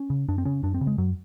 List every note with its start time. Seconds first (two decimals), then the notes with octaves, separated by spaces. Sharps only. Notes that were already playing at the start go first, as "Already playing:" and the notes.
Already playing: C#4
0.10 C#3
0.28 F#2 D4
0.38 C4
0.45 C#3 C#4
0.63 F#2 D4
0.74 C4
0.81 C#3
0.87 G#3
0.98 F#2 F#3